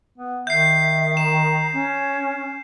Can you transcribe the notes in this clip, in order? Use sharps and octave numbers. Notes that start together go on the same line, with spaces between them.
B3
D#3 E5 G6 C7
A#5 E7
C#4